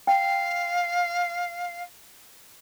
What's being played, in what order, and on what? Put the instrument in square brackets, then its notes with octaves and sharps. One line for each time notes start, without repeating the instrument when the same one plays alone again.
[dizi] F5 [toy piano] G5